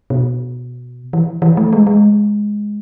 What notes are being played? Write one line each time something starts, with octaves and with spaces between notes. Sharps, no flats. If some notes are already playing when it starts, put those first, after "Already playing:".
B2
E3
E3
A3
G#3
G#3